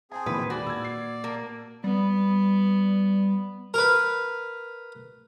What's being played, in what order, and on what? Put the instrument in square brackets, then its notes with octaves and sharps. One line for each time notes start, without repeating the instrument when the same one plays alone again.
[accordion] C4 G#4 [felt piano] G#5 A5
[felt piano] G#1 E2 [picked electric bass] A#2 D#3 [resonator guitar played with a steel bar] B4
[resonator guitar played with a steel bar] F#4 [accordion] D5
[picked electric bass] A#2 [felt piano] E6 G#6
[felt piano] C7
[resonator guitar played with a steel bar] A#3
[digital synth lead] G3 [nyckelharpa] B3
[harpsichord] A#4 B4